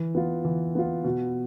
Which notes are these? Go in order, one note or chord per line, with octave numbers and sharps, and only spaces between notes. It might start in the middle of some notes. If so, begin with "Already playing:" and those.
Already playing: E3
B3 F4
E3
B3 F4
B2